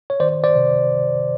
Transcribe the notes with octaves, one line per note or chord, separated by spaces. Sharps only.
C#5
D#3 C5 D5
C5 D5
C3